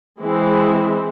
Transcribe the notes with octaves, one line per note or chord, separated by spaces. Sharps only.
E3 G#3 C4 E4